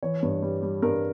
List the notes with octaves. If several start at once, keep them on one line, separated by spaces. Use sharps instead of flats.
E3 C#5
G2
G3
G3
G2 A#4